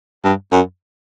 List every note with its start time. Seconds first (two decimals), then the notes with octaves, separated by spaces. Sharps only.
0.24 G2
0.52 F#2